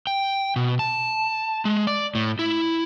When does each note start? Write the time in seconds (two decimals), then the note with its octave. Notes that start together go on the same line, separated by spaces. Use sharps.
0.07 G5
0.56 B2
0.79 A5
1.65 G#3
1.87 D5
2.15 A2
2.39 E4